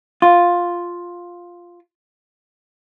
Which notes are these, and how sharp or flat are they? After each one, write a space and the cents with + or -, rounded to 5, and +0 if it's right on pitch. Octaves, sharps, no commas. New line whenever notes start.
F4 +5